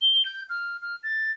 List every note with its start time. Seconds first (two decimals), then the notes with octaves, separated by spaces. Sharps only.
0.01 G7
0.25 G6
0.50 F6
0.82 F6
1.03 A6